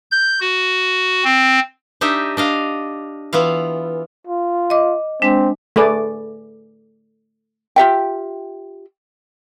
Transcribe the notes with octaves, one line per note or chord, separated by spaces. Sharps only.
G6
F#4
C4
D4 D#4 G4 D#5 E5
D4 D#5 F5
E3 B3 F4 F5
F4
D#5 D6
G#3 C4 D4
A3 G#4 B4 D5
F4 G4 E5 G5